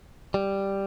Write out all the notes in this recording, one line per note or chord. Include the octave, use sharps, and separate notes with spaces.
G3